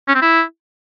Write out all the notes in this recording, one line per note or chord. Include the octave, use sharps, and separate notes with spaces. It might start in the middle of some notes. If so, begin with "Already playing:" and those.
C#4
C4
E4